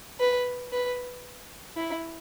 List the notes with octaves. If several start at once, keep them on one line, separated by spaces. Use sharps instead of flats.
B4
B4
E4